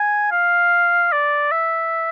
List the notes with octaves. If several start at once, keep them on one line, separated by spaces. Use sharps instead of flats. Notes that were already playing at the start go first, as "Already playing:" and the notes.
Already playing: G#5
F5
D5
E5